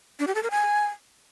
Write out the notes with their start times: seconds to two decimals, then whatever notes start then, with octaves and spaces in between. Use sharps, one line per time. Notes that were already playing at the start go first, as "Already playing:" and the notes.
0.20 D4
0.27 G4
0.35 A4
0.43 A#4
0.51 G#5